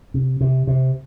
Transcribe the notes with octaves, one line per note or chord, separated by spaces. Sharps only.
C3
C3
C3